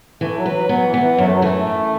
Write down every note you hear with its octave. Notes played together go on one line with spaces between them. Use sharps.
E3 A3
F#3
B4
F#3
F#3 B3
E3
B3
E3
F#2 F#3
A3
F#3
E3 A3
F#2